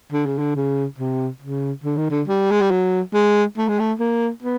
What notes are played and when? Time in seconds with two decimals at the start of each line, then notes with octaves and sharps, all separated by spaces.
0.12 D3
0.26 C#3
0.38 D3
0.55 C#3
0.98 C3
1.42 C#3
1.84 D3
1.97 D#3
2.11 D3
2.28 G3
2.51 G#3
2.61 G3
2.71 F#3
3.14 G#3
3.57 A3
3.69 G#3
3.79 A3
4.00 A#3
4.43 B3